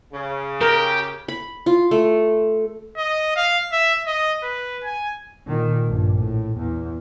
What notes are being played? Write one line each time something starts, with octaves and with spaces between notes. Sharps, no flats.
C#3
G4 A#4
B5
F4
A3
D#5
F5
E5
D#5
B4
G#5
A#2 D#3
A#1 G2
A2
E2